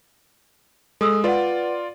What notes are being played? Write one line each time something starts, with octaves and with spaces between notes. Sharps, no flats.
G#3 A4 D#6 E6
F4 B4 D5 F#5